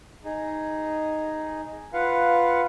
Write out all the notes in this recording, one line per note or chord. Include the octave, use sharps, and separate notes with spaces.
D#4 G#4
F4 B4 F5 F#5